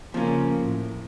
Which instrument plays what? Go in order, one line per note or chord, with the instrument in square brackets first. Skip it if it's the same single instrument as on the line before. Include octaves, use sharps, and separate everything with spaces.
[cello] C#3 A#3 [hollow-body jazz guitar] F3 C#4
[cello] A2